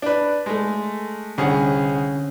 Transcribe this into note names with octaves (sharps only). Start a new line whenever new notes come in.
D4 B4
G#3 A3
C2 D3 C#4 G#4 C#5 F#5